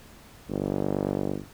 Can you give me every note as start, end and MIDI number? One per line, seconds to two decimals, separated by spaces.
0.50 1.37 31